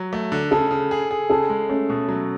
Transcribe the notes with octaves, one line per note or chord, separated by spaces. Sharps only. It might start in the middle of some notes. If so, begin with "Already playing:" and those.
Already playing: F#3
A3
D3
C#3 A4
C#3
G#4
G#4
C#3 A4
G#3
A3 C#4
B2
F#3